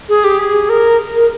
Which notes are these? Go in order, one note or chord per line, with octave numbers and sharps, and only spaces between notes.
G#4
G4
G#4
A#4
A#4